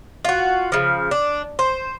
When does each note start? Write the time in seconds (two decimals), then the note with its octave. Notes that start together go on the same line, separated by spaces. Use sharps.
0.25 F4 F#4
0.72 C#3 F3
1.11 D4
1.59 C5